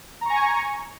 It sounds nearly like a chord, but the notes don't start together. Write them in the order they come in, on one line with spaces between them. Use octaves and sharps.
A#5 C#6 G#5